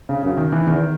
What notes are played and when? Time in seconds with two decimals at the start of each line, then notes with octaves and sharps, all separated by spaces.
0.09 C#3
0.23 F#2 C#3
0.37 D#3
0.52 E3
0.67 E2 D#3